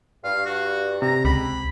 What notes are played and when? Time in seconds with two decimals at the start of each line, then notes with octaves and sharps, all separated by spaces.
0.24 G2 F5
0.46 F#4
1.02 C3 A#5
1.25 C#2 B5